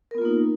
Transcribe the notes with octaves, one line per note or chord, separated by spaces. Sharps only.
A#3 B3 D#4 F4 A#4